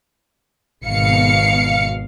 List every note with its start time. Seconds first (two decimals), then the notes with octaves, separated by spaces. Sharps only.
0.86 G#1 B2 F5 C#7